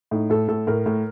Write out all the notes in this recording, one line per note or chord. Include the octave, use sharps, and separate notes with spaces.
A2 D#4
A2 A4
A2 A4
A2 A#4
A2